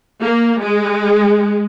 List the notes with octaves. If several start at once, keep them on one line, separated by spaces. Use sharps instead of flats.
A#3
G#3